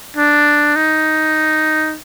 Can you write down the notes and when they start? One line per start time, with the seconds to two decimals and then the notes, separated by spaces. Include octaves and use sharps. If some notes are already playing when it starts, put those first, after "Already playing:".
0.17 D4
0.76 D#4